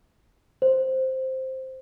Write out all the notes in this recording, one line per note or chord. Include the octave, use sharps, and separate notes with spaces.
C5